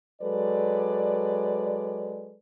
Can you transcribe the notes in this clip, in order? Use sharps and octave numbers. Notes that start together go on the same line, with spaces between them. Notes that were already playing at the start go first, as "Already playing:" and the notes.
F#3 G#3 A4 B4 D5